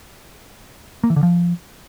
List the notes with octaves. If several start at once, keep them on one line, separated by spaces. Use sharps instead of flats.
A#3
E3
D3
F3